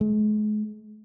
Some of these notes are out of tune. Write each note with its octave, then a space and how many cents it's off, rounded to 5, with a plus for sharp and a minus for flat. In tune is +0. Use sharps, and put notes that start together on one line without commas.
G#3 +40